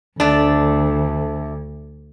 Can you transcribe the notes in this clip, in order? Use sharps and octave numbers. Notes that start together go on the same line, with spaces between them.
D2 A3 D4